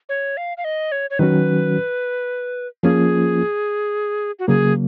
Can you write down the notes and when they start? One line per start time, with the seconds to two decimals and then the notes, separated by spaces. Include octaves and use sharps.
0.09 C#5
0.37 F5
0.57 F5
0.64 D#5
0.92 C#5
1.10 C#5
1.19 D#3 F#3 C#4 F#4 B4
2.83 F3 A#3 C#4 F4 G#4
4.39 F#4
4.48 C#3 F#3 A#3 G#4